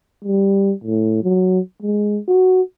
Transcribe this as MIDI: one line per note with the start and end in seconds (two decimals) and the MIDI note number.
0.25 0.73 55
0.84 1.20 45
1.23 1.60 54
1.82 2.20 56
2.28 2.62 66